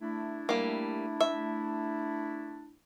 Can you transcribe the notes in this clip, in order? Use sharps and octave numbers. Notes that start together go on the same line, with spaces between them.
A3 D4 E4
G3 A#3
E5